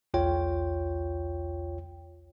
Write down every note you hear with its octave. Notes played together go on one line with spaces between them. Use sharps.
B1 E2 F4 C#5 G5